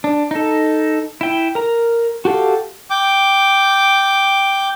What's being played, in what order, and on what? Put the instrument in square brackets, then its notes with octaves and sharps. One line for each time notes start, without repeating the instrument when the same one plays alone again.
[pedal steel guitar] D4
D#4 A4
E4 G5
A#4 A#5
F#4 G4 A4 F5
[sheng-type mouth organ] G5 D6